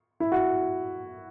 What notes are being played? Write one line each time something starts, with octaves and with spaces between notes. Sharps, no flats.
E4
F#4